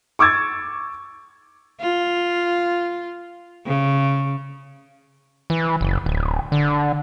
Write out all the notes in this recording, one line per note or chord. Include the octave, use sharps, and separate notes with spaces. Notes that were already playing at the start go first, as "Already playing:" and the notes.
C#6 D6 E6 G#6 A6
F4
C#3
E3
F#1
D1
D3